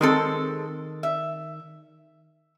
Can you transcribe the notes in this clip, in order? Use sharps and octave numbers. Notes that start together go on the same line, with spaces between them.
D#3 G#3 C4 A4
E5